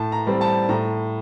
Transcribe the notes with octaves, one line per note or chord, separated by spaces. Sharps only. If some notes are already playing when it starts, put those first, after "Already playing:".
Already playing: A2 A5
A#5
G3 C4
A5
A2 A#5